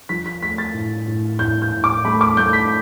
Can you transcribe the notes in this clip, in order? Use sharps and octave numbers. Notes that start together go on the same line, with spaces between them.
F3 B6
B6
A3 B6
A6
A2
A2
A2 G6
G6
A2
D6
A3 B5
D6
A3 G6
B6